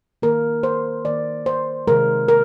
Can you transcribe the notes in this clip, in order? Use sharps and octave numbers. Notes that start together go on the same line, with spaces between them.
D#3 A#3 A#4
C5
D#3 A#3 D5
C5
C3 D#3 G#3 A#4
A#4